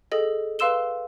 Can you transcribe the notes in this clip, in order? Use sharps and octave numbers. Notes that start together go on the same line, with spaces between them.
G#4 A4 D#5
B4 F5 C6 E6 E7 G7